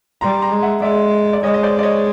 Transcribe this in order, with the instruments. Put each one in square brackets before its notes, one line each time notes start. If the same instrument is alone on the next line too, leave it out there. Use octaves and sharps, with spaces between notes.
[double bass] G3 [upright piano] A#5 C6
[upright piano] A#5 C6
[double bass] G#3
[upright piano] E5 F#5
[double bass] G#3 [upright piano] D5 E5
[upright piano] D5
[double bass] G#3 [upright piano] C#5 D#5
[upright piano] D#5
C5 D5
D5
C#5 D#5